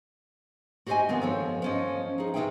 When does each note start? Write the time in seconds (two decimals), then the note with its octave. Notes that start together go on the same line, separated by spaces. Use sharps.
0.86 F#4 G4 C5 D5 D#5 G#5
1.09 D#3 F3 B3 C4
1.22 F3 A4 C#5
1.62 F3 C#4 D#5
2.18 D#4 G#4
2.34 C3 C#4 G4 G#4 E5 G5